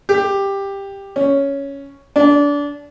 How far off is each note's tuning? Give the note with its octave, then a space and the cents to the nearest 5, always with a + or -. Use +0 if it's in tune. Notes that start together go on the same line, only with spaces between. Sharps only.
G4 +10
C#4 +5
D4 -25